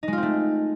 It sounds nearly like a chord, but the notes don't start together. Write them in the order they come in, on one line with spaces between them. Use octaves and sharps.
D#4 G#3 F4 C4 A3